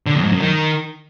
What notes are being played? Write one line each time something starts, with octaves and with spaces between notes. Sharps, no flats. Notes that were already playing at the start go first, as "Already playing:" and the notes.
D3
F2
G#2
F#2
D#3